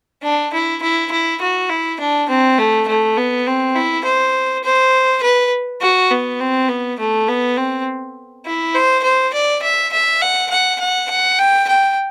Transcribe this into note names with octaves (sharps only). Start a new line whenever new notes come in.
D4
E4
E4
E4
F#4
E4
D4
C4
A3
A3
B3
C4
E4
C5
C5
B4
F#4
B3
C4
B3
A3
B3
C4
E4
C5
C5
D5
E5
E5
F#5
F#5
F#5
F#5
G5
G5